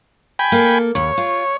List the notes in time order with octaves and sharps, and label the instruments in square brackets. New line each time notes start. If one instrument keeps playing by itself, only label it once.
[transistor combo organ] G5 G#5 B5
[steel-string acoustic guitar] A#3 A4
[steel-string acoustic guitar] D#2 [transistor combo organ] C#5
[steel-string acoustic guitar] F4